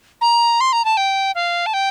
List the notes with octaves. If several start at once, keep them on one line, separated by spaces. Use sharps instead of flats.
A#5
C6
A#5
A5
G5
F5
A5
G5